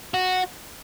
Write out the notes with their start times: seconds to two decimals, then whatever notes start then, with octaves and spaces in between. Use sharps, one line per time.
0.14 F#4